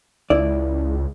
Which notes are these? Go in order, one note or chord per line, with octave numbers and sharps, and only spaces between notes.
C#2 E4 D5